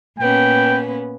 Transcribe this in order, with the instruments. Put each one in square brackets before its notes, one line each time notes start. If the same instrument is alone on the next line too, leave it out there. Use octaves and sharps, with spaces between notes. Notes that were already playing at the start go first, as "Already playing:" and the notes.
[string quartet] A#2 B3 C#4 [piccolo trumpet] G5